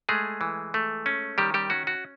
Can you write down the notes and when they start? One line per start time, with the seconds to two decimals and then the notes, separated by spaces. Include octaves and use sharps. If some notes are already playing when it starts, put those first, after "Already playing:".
0.09 G#3 A3 G#4
0.41 E3
0.74 A3
1.06 C#4
1.38 D#3 G3 G4
1.54 G3 G4
1.70 C#4 F#4
1.87 F#4